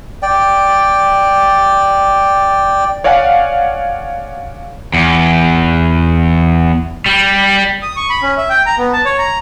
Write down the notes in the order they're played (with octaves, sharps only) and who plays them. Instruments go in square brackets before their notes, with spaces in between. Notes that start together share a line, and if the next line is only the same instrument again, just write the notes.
[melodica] D5 G5
[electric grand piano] C#5 D5 F5 F#5 G#5
[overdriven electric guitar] E2
G3
[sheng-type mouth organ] D#6
C#6
B5
C#4
E5
G5
A#5
B3
A5
C#5
A#5